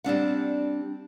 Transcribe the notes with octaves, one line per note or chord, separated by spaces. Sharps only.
G3 C4 D4 F#5